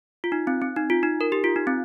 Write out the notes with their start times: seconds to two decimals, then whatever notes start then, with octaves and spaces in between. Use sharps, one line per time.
0.24 F4
0.32 D#4
0.47 C4
0.62 C4
0.76 D#4
0.90 F4
1.03 D#4
1.21 A#4
1.32 G4
1.44 F4
1.56 D#4
1.67 C4